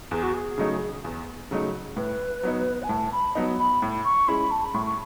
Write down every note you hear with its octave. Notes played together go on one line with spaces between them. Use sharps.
E2 G#4
F#4
G#4
C#3 F#3 A3 D#4
E2
C#3 F#3 A3 D#4
A2 B4
F#3 B3 D#4
G#5
A2 A5
B5
F#3 B3 D#4
B5
A2
C#6
G#3 C#4 E4 B5
A5
B5
A2 C#6
C#6